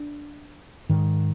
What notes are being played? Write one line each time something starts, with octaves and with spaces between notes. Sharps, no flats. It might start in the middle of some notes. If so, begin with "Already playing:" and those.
Already playing: D4
G#2 D#3